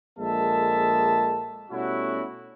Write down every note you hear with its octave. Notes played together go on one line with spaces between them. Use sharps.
A#1 G#3 A#3 A4 E5 A5
B2 G3 A3 C#4 E4 F#4